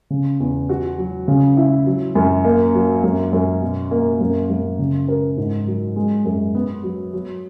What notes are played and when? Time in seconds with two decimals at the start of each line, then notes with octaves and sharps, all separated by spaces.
0.10 C#3
0.40 E2
0.69 F#4
0.98 F#3
1.28 C#3
1.57 E4
1.86 F#3
2.15 F#2
2.44 A#3
2.75 F#3
3.04 F#2
3.33 F#2
3.62 B2
3.91 A#3
4.20 F#2
4.50 F#2
4.79 C#3
5.08 A#4
5.37 G#2
5.67 F#3
5.96 G#3
6.25 F#2
6.55 B3
6.83 F#3
7.13 F#3